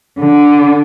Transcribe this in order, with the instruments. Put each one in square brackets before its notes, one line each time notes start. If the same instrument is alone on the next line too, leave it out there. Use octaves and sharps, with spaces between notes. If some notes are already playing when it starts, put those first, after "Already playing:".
[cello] D3